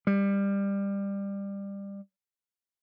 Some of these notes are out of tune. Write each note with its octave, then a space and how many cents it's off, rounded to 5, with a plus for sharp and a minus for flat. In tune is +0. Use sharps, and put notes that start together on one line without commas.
G3 +20